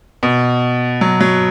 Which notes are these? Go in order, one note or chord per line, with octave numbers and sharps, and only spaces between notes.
B2
F#3
F#3